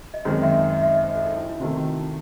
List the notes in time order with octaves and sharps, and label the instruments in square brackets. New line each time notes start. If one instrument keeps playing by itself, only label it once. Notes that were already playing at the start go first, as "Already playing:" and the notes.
[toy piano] D#5
[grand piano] F#2 D#3 G#3 C4 [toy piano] C#5
[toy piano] E5
D#5
D#5
E5
D#5
C5
A4
D#4
E4
E4
[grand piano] C3 D#3 A3 [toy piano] F#4
[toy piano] F#4